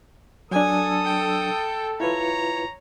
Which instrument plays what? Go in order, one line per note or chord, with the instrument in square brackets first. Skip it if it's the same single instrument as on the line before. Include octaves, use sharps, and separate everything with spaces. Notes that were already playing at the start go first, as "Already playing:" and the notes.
[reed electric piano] F#3 D4 [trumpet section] A4 [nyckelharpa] G#5 [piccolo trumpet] D#6
[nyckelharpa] G5
[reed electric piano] E4 F4 B4 [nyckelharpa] C#5 [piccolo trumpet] A#5